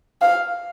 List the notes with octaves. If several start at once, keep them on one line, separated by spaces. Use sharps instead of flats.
F5